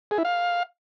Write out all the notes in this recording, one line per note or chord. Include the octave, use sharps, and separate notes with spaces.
G#4
E4
F5